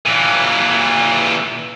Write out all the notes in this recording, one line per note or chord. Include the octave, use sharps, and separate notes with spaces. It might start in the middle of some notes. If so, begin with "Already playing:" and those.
A#2 E3